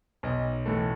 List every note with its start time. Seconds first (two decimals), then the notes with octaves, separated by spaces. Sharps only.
0.23 B1 D#5
0.66 A2 E3 A3